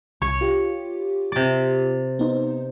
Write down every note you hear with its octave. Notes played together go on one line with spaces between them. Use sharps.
C2 C#5
F4 G4
C3 D5
B3 D#4 C5